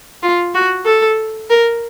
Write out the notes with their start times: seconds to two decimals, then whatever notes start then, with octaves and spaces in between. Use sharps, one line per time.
0.23 F4
0.55 F#4
0.86 A4
1.50 A#4